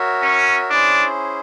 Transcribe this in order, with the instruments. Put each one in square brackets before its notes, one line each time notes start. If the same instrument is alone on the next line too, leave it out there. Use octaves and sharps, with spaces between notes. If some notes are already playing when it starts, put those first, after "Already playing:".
Already playing: [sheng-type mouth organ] F#4 A#4 C#5 E5
[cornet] C#4
[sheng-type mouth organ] C#4 E4 G#4 C5 [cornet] D4